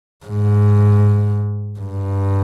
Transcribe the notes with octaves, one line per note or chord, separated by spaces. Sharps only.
G#2
G2